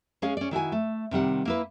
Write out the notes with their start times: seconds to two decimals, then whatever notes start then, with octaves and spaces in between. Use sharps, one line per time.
0.22 G#3 C#4 G#4 F5
0.37 C#4 D5
0.51 D#3 E4 F#4 G#5
0.72 A3
1.11 C3 D#3 G3 F#5
1.45 A#3 E4 B4